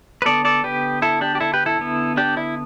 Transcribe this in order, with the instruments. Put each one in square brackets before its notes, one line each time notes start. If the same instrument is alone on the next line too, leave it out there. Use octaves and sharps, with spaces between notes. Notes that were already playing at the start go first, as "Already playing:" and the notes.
[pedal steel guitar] B4
D3 B3 A4 D5
A4 D5
G4 B4
E4 A4
D4 G4
G4
E4 A4
G4 B4
E4 A4
D3 B3
D4 G4
E4